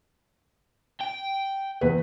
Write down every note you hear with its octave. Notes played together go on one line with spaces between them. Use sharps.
G5
E2 B4